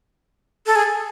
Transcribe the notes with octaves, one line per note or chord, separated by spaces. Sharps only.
A4
G#4